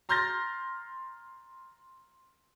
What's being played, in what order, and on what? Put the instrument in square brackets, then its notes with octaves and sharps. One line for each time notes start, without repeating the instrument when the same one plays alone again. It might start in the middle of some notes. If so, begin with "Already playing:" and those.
[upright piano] A#5 C6 F6 G6 A6 A#6